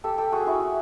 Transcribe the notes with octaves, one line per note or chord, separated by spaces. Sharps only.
G4 A4
G4 A4
F#4 G#4
E4 F#4